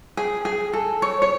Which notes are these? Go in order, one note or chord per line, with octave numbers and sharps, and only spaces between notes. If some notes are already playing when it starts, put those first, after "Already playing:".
G#4
G#4
A4
C#5
C#5